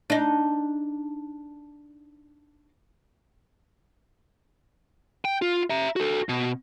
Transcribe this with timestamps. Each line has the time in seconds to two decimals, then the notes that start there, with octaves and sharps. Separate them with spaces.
0.10 D4 D#4
5.25 G5
5.42 F4
5.70 E5 A#5
5.96 F#4 A4
6.29 B2